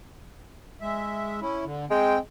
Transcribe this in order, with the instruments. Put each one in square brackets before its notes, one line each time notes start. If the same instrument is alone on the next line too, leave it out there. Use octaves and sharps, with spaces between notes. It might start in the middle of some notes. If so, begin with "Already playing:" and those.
[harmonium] G#3 E5
C#4 E4
D3
[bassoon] G#3 [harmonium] C4 G5